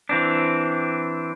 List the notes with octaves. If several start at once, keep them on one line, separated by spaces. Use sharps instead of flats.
E3 C4 D4